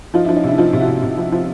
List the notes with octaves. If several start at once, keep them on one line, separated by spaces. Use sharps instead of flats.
F3 D#4 F4
F3 D4 E4
C#4 D#4
C3 D4 E4
F3 D#4 F4
C3
E4 F#4
C3
C3
F3
F3